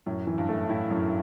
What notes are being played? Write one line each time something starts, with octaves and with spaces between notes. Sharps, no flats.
F#2 A2
E3
G2
A3
A2 E4
F#2